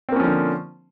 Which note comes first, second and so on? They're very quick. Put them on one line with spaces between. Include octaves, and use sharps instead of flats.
C4 A#3 C#4 F3 D3